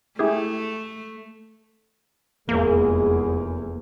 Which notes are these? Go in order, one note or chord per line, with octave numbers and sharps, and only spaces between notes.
A3 E4 G4 G#4
F1 E2 G#3 A#3 G#4